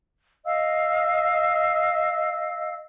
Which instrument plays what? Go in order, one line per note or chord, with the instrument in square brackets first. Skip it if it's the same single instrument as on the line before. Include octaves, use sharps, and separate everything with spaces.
[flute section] D#5 F5 E6